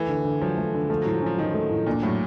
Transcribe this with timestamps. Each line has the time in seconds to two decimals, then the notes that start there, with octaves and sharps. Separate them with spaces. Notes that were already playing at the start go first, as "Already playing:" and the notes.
Already playing: E3 A3
0.08 D3
0.25 D3
0.41 F3 F#3
0.58 A3
0.74 D3
0.90 F3 A3
1.02 F#3
1.05 A2 F3
1.14 F#3
1.22 F3 C#4
1.38 D#3 F3
1.54 A3
1.70 A2
1.87 A#2 D4
2.02 A2 F#3